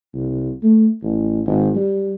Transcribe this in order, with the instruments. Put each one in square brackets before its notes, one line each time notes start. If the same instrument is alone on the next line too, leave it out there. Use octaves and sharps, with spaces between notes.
[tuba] C2
A3
A1
G#1
G3